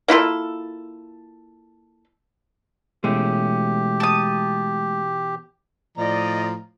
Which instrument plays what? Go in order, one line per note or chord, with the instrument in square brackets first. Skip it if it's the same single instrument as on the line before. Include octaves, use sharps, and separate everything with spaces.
[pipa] A#3 E4 F4 A4
[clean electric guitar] B2 E3 C#4 [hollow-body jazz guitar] G#3 A3 [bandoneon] G4
[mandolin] A5 D#6
[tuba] A2 [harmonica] F3 A#5 [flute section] D5 D#5